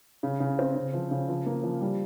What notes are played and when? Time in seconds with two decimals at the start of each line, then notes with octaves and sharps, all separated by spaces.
0.23 C#3
0.40 C#3
0.59 C4
0.75 C#3
0.94 F3
1.11 C#3
1.29 F3
1.46 A#3
1.63 F3
1.81 G3